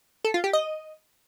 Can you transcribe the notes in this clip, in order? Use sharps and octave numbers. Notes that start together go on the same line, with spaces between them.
A4
F4
G4
D#5